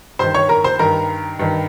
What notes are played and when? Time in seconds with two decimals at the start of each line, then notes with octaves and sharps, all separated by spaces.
0.19 G2 D#3 C5 C6
0.34 C#5 C#6
0.49 A#4 A#5
0.64 C5 C6
0.79 G2 D#3 A#4 A#5
1.39 G2 D#3